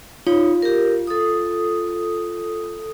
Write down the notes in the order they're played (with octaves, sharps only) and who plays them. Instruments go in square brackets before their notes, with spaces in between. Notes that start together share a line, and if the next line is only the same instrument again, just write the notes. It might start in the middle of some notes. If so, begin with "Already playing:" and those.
[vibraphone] D#4 C#5 [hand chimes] F4
[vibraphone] G4 A#4
A4 D#6